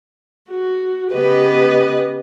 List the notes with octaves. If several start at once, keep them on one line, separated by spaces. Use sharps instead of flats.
F#4
C#3 B3 G4 B4 D#5